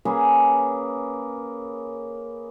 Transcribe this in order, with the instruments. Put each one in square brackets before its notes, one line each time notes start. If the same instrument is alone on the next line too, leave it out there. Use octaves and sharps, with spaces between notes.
[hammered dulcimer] A#3 C#4 G#4 B4